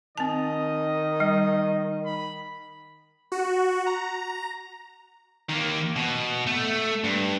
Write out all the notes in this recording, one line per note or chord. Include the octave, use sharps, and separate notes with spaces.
D#3 C4 D#5 A5
G3
B5
F#4
A#5
D#3 A#3
B2
A3
G2